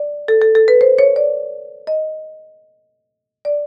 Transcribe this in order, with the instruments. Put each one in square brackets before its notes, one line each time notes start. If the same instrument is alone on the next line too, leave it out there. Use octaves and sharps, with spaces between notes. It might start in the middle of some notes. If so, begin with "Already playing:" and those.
Already playing: [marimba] D5
A4
A4
A4
B4
C5
C#5
D5
D#5
D5